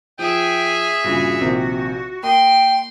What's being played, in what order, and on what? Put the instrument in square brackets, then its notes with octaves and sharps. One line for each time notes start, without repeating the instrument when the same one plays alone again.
[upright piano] F3 [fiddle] G#4 E5 [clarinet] G5
[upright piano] G2 A#2 C#3 [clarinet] F#4
[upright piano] A#1 C3 D#3
[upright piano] A#3 [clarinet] D#5 [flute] G5 [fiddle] C6